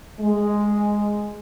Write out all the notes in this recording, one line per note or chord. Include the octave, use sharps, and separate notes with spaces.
G#3